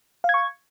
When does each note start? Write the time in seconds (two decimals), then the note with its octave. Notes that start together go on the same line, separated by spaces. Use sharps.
0.24 F5
0.29 G#6
0.34 C#6